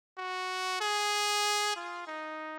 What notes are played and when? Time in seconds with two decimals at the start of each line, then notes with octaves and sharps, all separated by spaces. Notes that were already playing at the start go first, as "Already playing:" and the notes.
0.18 F#4
0.81 G#4
1.76 F4
2.07 D#4